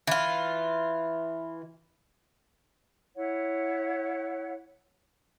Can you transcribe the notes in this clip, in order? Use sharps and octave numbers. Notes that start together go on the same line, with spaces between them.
E3 F4
E4 C#5 F#5